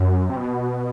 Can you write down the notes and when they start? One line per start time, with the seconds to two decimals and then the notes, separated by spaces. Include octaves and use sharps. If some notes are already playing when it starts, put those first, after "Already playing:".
Already playing: F#2
0.30 C3
0.36 B2